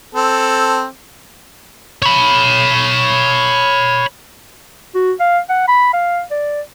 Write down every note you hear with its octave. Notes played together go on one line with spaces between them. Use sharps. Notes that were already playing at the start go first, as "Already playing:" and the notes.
C4 A4
C#5 B5
F#4
F5
F#5
B5
F5
D5